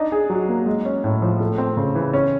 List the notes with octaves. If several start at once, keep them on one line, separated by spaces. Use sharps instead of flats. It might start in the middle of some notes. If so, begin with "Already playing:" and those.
Already playing: D4 D#4
G#4
F#3
A#3
G#3
C#4
A2
F3
A3
C4
C#3
E3
C#4